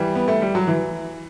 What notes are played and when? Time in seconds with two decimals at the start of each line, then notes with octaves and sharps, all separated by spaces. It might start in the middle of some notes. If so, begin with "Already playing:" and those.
Already playing: E3 G3
0.15 B3
0.28 A3
0.42 G3
0.55 F#3
0.67 E3